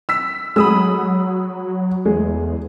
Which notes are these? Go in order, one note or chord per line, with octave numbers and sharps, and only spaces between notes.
E6 B6
F#3 G#3 B5 D#6 E6
E2 G#3